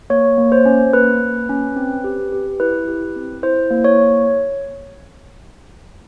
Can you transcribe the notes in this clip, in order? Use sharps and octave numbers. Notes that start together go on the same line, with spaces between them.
A#3 C#5
A#3
C5
C#4
A#3 B4
A#3
C#4
C4
G4
G4
E4 B4
G4
C4
E4 C5
A#3
C#5